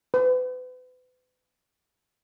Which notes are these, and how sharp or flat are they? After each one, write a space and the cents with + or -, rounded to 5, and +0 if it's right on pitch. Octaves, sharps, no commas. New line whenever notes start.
B4 +35